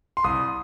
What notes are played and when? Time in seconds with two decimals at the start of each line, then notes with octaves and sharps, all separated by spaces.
0.17 C6
0.24 C2 D#6